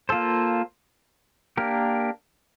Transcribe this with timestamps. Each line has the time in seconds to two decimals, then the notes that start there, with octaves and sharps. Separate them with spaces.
0.09 A#3 F4 A4 C5
1.57 A#3 D4 G4 A#4